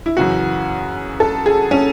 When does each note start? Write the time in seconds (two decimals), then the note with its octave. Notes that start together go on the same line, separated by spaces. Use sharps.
0.06 E4
0.17 F#2 C#3 E3 F#4
1.20 A4
1.46 G#4
1.71 C#4